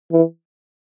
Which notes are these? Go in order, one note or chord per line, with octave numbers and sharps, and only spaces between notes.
E3